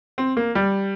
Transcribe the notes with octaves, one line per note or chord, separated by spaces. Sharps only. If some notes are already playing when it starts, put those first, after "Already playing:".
C4
A#3
G3